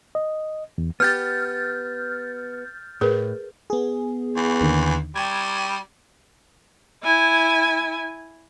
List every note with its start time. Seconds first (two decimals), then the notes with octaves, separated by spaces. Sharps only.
0.15 D#5
0.78 E2
1.00 B3 G4 F6 G6 A6
3.01 A2 G#4 A#4 B4
3.70 B3 G#4
4.36 E2
4.61 D#2 D3 D#3
5.15 G3 G5 G#6
7.03 E4 G#5